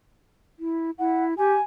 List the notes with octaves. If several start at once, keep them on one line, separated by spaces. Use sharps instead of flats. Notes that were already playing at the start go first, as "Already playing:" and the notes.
E4
E4 F#5
G4 G#5